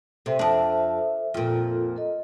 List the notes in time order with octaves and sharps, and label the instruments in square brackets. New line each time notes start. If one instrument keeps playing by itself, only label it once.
[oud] C3 [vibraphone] A4 C5 E5
[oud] F2 D4
[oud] F2 A#2 [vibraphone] F4 A4
[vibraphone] A4 D#5